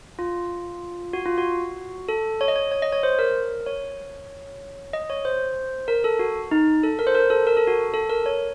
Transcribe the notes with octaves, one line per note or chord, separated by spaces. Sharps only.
F4
F#4
F4
F#4
A4
C#5
D#5
C#5
C#5
D#5
C#5
C5
A#4
C#5
D#5
C#5
C5
A#4
A4
F#4
D#4
A4
A#4
C5
A#4
A4
A#4
A4
F#4
A4
A#4
C#5